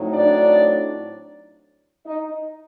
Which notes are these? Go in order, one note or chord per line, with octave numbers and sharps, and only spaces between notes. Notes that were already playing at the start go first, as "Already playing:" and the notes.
Already playing: A2 F#3 C4 D#4
D4 D5
D#4 D#5